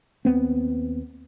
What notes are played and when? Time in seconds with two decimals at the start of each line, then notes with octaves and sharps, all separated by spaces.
0.25 D#2 B3 C4